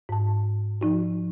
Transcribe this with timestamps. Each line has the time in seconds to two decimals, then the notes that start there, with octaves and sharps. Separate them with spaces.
0.09 G#2 A5
0.81 F3 D#4 F#4